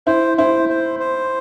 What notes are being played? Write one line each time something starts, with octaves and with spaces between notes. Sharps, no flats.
E4 C5
E4 C5
C5
C5